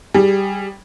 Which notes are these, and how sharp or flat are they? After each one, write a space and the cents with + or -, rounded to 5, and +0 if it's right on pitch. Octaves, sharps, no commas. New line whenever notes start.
G3 +0 G#4 -15